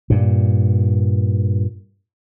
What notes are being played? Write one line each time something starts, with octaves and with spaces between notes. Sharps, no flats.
G2 A#2